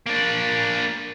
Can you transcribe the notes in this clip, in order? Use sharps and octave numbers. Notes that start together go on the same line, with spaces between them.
A#3 D4